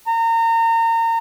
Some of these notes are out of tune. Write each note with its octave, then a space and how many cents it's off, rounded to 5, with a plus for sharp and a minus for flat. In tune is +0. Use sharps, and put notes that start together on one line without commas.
A#5 -30